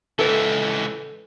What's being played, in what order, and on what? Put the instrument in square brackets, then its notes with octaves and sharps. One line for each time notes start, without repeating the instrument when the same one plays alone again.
[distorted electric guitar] C#2 E3 [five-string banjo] A4 B4